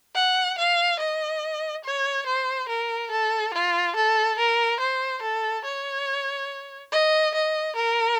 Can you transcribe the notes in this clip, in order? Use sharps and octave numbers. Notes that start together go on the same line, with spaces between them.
F#5
F5
D#5
C#5
C5
A#4
A4
F4
A4
A#4
C5
A4
C#5
D#5
D#5
A#4